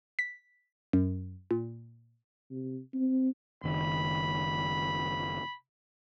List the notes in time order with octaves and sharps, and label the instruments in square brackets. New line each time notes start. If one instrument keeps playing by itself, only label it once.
[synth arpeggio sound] B6
F#2
A#2
[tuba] C3
C4
[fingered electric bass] F#1 D#3 [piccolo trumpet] B5